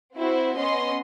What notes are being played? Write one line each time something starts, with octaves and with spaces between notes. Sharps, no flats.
C4 E4 F#4 C5
B3 C#4 D#5 C6